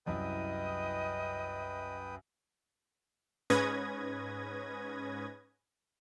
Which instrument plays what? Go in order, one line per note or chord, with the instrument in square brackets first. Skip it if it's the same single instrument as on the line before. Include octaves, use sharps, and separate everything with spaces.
[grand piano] C2 F#2 E4 [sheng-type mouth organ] B4 G5 D#6 [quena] D#5
[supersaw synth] G#2 C#4 B4 D#6 G#6 A#6